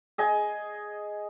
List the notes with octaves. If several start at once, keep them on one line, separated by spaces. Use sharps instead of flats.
G#4 D#5 G#5